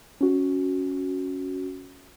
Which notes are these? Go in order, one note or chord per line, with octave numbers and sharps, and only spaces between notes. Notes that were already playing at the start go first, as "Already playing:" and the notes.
C#4 F#4